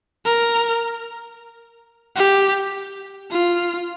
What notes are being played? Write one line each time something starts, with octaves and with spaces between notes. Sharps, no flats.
A#4
G4
F4